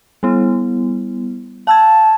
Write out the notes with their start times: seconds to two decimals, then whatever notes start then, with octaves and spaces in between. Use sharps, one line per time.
0.23 G3 B3 E4
1.67 F5 A5 E6 G#6